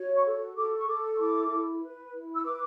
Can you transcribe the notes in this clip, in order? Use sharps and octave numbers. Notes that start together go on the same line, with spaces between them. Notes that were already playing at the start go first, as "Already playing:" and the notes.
Already playing: F#4 C#5
C#6
A4
A4 D6
C#6
A4 D6
C#6
E4 D6
E4
B4
E4
E6
B4 D6